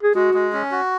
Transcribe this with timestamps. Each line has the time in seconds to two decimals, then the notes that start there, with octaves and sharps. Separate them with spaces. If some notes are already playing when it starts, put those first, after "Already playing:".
0.03 G#4
0.15 G#3 F#4
0.34 G#3
0.53 C#4
0.71 F#4